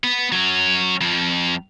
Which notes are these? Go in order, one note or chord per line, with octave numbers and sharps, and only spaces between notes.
B3
F#3 C#4
F2 F3